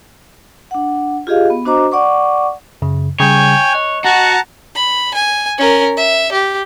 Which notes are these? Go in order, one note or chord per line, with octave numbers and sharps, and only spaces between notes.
D4 F#5
F4 G4 G#4 D#5 F5
B3
D4 F#4 C5 D#5 A#5 D6
D5 F#5 C#6 D6
F#2 C#3
C#3 G3 C#5 G5 G#5
D#5 F#6
F#4 F#5 A5 A#5
B5
G#5
C#4 A#4
E5
G4